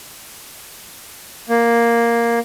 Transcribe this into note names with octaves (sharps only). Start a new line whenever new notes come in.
A#3